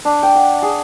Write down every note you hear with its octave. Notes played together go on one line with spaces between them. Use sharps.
D4
G5
F#5
G#4